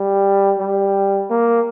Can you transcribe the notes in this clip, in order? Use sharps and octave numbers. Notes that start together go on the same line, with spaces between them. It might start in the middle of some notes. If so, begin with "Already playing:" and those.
Already playing: G3
G3
A#3